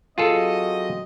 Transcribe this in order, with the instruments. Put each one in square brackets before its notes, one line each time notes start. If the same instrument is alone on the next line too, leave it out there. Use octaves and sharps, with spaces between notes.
[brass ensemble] F#3 C4 D#5 [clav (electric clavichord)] F4 G#4 A4